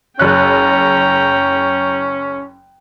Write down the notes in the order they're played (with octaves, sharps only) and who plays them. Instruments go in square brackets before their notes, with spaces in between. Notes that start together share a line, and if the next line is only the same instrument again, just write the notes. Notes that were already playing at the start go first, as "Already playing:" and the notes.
[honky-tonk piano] F#1 F#6 [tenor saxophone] C#4 [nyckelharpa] G5 A#5